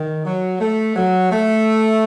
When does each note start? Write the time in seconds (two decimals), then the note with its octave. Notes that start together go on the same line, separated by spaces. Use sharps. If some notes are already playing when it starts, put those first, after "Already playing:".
Already playing: D#3
0.25 F#3
0.60 A3
0.96 F#3
1.31 A3